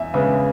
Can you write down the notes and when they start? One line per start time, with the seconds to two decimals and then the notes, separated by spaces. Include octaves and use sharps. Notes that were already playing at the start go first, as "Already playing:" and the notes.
Already playing: E2 E5
0.14 C#3 G#3 B3 E5